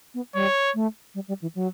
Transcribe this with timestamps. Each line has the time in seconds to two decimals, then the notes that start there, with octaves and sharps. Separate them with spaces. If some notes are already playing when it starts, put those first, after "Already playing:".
0.14 B3
0.34 G3 C#5
0.74 A3
1.14 G3
1.28 G3
1.42 E3
1.55 F#3